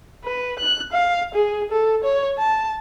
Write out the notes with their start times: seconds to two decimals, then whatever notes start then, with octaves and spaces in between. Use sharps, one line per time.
0.24 B4
0.59 F#6
0.92 F5
1.34 G#4
1.71 A4
2.04 C#5
2.38 A5